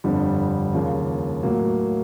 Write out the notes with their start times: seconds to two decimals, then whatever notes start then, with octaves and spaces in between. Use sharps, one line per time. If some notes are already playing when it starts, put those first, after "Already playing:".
0.04 G1 F2 D3 G3
0.73 D#2 C#3 F3 A#3
1.43 A2 F#3 A#3